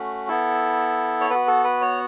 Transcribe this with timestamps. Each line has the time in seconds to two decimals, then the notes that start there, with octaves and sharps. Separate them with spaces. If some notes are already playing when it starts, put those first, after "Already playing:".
Already playing: A3 C#4 F#4
0.28 B3 E4 A4
1.21 C#5
1.30 B3 F#4 B4
1.47 A4
1.64 B4
1.82 C#5